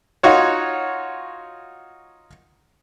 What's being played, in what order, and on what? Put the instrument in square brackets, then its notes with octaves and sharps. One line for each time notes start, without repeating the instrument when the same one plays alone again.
[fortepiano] D#4 F4 F#4 C#5